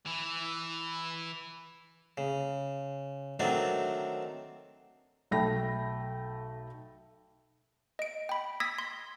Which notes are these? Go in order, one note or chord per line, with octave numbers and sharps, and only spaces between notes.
E3 E4
C#3
D#3 F#3 A3 C4 D4
B1 A3 G5 B5 A#6
D#5 D7
G5 B5
D#6 E6 G#6 A#6 B6
C6